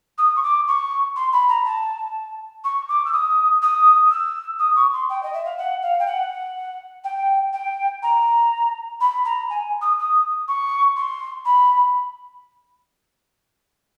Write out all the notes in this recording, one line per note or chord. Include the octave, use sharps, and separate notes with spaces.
D#6
C#6
D6
C#6
C6
B5
A#5
A5
C#6
D6
E6
D#6
D#6
E6
D#6
C#6
C6
G5
D#5
E5
F5
F#5
F5
G5
F#5
G5
G5
A#5
B5
A#5
G#5
D#6
D#6
C#6
C6
B5